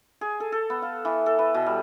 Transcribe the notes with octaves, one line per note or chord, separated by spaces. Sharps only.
G#4
A4
A4
B3
F5
E3
A4
B4
B2
G3